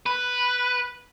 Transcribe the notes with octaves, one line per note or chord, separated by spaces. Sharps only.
B4